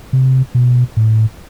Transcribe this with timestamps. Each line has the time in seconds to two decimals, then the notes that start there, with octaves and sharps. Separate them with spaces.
0.13 C3
0.55 B2
0.97 A2